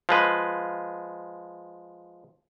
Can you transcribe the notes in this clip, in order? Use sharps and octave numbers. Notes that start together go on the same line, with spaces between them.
F3 G#3 B4